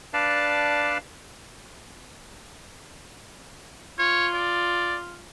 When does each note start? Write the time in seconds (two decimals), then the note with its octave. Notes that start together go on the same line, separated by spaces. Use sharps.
0.14 D4 B4 D5 F5 A5
3.99 F4 C#5
4.34 D5